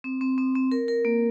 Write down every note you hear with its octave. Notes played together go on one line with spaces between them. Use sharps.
C4
C4
C4
C4
A#4
A#4
A#3